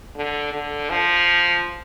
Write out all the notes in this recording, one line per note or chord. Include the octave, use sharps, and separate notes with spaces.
D3
D3
F3